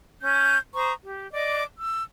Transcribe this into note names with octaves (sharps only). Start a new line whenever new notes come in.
C#4 G6
C5 A#5 C#6 D#6
G4
D5 D#5 D6
E6